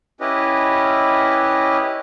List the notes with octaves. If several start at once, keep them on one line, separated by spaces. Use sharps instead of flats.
C#4 E4 G4 B4 D#5